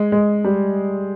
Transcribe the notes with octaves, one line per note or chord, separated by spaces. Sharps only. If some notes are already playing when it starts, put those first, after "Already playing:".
Already playing: G#3
G#3
G3